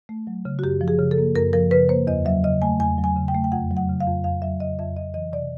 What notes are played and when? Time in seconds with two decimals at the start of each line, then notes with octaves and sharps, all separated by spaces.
0.09 A3
0.27 F#3
0.45 C#3
0.59 F#4
0.63 F#2 G4
0.81 F3
0.88 G#4
0.99 C#3
1.11 A4
1.18 A#3
1.36 F#2 A#4
1.53 F3 A#4
1.71 C#3 B4
1.89 A#3 C5
2.07 E2 D#5
2.25 F#3 E5
2.44 C#3 D#5
2.62 A3 G#5
2.80 E2 G#5
2.98 F#3
3.04 G#5
3.16 C#3
3.28 G5
3.35 A3
3.44 G5
3.52 F2 F#5
3.71 F#3
3.77 F#5
3.89 C#3
4.00 F5
4.07 F2
4.24 F2 F5
4.42 F#3 E5
4.60 C#3 D#5
4.79 F2 E5
4.97 F2 D#5
5.14 E3 D#5
5.33 C3 D5